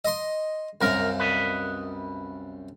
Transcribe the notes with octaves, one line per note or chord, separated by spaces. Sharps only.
D#5 C6
C2 F#2 A#4 F5
B4 D#5